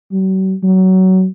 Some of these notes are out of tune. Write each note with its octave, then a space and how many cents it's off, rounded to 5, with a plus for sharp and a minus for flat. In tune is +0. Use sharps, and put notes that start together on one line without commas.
F#3 +45
F#3 +20